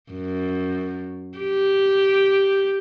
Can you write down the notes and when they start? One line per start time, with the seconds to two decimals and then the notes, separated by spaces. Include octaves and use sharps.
0.11 F#2
1.38 G4